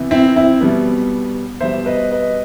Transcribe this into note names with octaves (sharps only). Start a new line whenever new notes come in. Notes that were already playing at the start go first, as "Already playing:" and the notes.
Already playing: C3 E3 B3
C4 E4
C4 E4
B2 G3 B3
B2 G3 B3 C5 E5
B4 D#5
B4 D#5